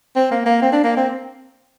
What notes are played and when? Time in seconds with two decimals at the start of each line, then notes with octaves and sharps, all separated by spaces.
0.16 C4
0.31 A#3
0.46 A#3
0.62 C4
0.72 D4
0.84 A#3
0.96 C4